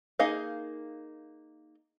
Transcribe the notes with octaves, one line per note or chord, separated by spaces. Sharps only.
A#3 D#4 G#4 D#5 F5